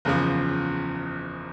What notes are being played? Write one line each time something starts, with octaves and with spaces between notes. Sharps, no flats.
F#1 E2 C#3 F3